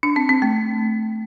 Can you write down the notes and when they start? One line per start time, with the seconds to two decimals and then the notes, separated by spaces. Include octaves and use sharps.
0.03 D4
0.16 C4
0.29 C4
0.42 A3